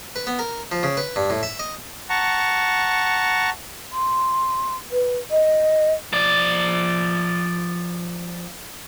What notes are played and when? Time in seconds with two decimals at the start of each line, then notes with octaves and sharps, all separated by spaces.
0.16 B4
0.27 B3
0.39 A#4
0.72 F3
0.83 C#3
0.97 B4
1.16 G2
1.30 A2
1.43 E5
1.59 D#5
2.10 F#5 A5 A#5 C#6
3.92 C6
4.91 B4
5.31 D#5
6.13 F3 D5